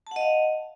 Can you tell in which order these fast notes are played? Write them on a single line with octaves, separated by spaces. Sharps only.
A5 F#5 D#5 F5